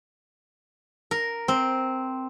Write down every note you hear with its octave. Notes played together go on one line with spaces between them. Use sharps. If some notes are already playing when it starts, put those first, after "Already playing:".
A#4
C4